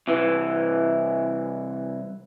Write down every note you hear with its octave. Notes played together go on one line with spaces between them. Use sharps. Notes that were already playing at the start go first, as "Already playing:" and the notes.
C2 E3